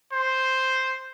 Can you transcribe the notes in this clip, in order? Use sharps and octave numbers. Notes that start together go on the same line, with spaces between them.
C5